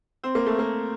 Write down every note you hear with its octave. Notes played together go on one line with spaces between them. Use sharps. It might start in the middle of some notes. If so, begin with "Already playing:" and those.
C4
A#3
A3
A#3